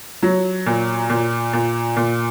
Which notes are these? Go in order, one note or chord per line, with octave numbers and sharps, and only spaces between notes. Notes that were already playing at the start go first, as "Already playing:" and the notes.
F#3
A#2
A#2
A#2
A#2